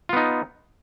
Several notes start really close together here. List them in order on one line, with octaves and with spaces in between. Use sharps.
F4 B3 D#4